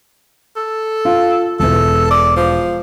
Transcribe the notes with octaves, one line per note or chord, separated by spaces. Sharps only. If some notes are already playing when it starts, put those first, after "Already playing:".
A4
F4 F5
E1 E3 A4
D5
F3